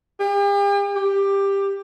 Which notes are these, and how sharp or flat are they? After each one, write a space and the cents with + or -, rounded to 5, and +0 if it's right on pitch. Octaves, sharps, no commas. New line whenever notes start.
G4 +45
G4 +10